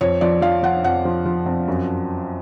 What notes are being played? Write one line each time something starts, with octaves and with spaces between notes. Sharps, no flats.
F2 C#5
F3 D5
F3 F5
F3 F#5
F2 F#5
F3
F3
F2
F#2